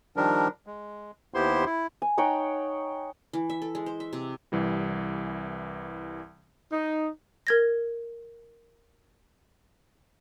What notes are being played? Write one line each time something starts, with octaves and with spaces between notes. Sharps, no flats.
D#3 F3 G3 D4 A#4
G#3
D#2 B3 E4 G4 C5 C6
E4
G#5
D#4 C#5 F#5 G5
E3
E5
A4
G#3
C5
E5
C3
C2 E3 G3
D#4
A#4 G#6 A#6